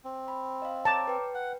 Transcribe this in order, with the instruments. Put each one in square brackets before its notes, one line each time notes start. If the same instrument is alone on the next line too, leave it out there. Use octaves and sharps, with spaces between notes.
[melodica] C4
[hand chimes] B5
D#5 F5
[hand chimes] C#5 A#5 D6 [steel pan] A5
[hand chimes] B4 G5
[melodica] F#5